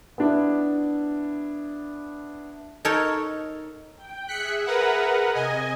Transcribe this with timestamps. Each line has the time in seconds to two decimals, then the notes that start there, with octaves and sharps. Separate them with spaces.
0.18 B3 D4 E4
2.85 D#4 A4 A#4 C#5
3.96 G5
4.28 G#4 E5 F#6 B6 C#7
4.66 A#4 B4 F#5
5.34 C3 D#5 G#5 G#6